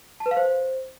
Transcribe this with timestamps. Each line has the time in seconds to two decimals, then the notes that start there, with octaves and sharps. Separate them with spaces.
0.20 A5
0.26 B4
0.31 F5
0.37 C5